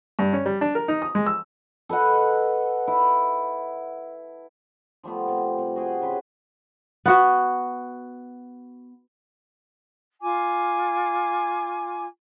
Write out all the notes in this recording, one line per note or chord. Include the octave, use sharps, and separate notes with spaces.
G2
C#4
G3
D4
A#4
D#4
D#6
G#3
E6
A4 B4 D#5 F#5
E4
F3 G3 A3 B3
C3
C3
F#4 G#4 G5 G#5
C#3 B4 C6
B3 F#4
F4 G#5 D6